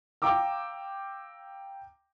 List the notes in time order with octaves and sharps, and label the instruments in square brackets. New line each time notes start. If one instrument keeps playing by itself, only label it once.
[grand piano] F5 G5 A#5 D6 E6